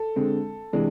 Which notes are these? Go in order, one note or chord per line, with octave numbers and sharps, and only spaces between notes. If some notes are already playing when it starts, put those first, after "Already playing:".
Already playing: A4
D3 G#3 C4
C3 E3 G#3 D4